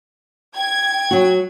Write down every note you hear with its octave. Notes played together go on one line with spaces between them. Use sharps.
G5 G#6
F#3 F#4